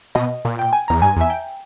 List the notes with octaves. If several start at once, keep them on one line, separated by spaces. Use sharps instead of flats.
B2 D#5
A#2
G5
G#5
E2 A#5
G2 G#5
E2
E5
G5